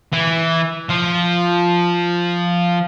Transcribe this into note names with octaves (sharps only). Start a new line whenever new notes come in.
E3
F3